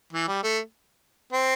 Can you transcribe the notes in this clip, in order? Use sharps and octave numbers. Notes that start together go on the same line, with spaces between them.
E3
G3
A3
C4